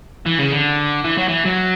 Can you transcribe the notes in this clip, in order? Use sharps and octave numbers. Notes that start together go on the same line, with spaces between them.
E3
C#3
D3
E3
F#3
E3
F#3